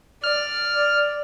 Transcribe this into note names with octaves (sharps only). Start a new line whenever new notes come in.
D5 F6